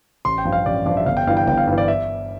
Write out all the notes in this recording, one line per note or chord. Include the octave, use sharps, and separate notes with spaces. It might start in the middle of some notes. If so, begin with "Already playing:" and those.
A1 C6
G5
G2 F3
F5
A1 D5
G2 F3 D5
E5
G1 F5
G5
G2 E3 F5
G5
G1 G5
F5
G2
E3
D5
E5